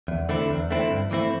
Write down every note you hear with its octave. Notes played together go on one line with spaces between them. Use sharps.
E2
D3 A3 C4 E4
E2
D3 A3 C4 E4
G2
E3 A3 C4 E4